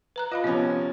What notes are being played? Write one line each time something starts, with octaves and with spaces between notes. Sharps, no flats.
B4 A#5 F#6
F4 D#5 F5 B5
C3 F3 B3 C#4